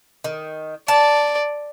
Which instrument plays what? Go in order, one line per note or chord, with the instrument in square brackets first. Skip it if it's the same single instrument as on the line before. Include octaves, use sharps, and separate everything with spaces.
[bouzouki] D#3
[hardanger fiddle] D5 [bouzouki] A5